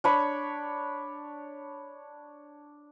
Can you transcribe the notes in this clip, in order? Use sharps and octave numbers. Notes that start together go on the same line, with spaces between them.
D4 C#5 B5